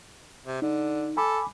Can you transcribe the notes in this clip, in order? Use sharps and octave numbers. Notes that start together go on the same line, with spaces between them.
C3
D3 D#4
A4 G#5 B5 D6